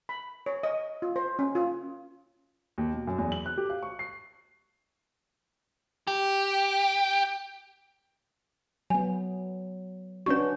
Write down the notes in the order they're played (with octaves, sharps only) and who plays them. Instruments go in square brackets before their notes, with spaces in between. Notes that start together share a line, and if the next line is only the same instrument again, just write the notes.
[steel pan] B5
C#5
D#5
F4
C5
C#4
F4
[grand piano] D#2
B2
F#2
E2
F#7
F#6
G4
F5
C#6
C7
[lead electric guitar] G4
[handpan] F#3 B3 [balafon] G#5
[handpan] C#4 D4 F#4 [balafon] B4 C#6